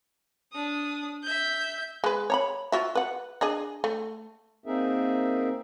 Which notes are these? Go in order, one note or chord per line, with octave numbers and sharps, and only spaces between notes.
D4 D#6
E5 G6
G#3 B4
C#5 A#5 B5
F4 F#4 E5
B4 F#5
D4 G#4 D#5
A3
A#3 C4 D#4 G#4 A#4 E5